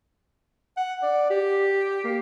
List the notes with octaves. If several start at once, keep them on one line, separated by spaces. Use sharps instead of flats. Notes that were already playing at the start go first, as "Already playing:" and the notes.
F#5
D5
G4
A#3